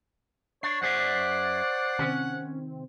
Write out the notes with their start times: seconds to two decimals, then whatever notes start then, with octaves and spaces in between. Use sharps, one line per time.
0.63 D4 C#5 C#6 C7
0.82 F#2 G#4 C5 D5 E5 F#5
1.99 C3 D#3 C4 C#4